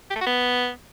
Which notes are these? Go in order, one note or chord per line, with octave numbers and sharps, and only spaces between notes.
G4
A3
F#4
B3